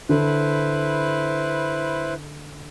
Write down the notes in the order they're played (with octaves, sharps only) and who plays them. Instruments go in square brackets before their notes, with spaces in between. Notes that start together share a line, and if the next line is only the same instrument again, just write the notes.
[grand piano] D3 [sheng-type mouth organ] E4 B4 C5